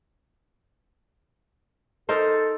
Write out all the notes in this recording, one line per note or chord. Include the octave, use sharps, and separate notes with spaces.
D#4 A4 A#4 C5